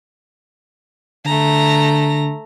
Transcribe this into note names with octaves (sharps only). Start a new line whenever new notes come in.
D3 A3 A#5